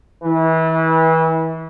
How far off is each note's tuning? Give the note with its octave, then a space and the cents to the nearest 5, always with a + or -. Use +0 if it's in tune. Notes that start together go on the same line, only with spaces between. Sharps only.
E3 -30